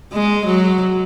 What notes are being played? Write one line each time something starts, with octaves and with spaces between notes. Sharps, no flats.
G#3
F#3